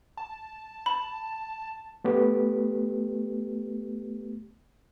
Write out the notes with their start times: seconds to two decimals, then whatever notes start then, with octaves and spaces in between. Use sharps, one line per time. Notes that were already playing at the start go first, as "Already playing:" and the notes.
0.17 A5
0.86 A5 B5
2.04 A3 B3 G4